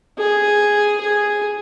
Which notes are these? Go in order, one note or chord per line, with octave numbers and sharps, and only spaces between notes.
G#4
G#4